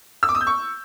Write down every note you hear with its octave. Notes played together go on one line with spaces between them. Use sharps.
E6
D6
D#6
G6
C#6